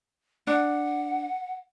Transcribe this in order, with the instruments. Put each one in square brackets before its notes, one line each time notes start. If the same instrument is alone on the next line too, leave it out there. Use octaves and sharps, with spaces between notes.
[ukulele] D4 [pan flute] F#5